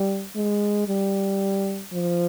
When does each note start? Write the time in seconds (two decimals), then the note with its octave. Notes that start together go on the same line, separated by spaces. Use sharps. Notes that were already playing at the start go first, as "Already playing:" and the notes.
Already playing: G3
0.36 G#3
0.88 G3
1.93 F3